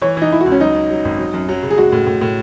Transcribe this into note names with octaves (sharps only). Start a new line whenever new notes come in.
E3 C#5
E3 D#4
E3 E4
F#4
C#2
C#4
F#3 D#4
C#4
F#3
G#1
F#3
F#2
F#3
C#3
G#4
G#3 F#4
A2
A2
A2